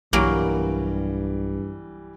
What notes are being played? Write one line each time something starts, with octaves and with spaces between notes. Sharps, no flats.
B1 G2 E3 F#3 G3 A#3 D7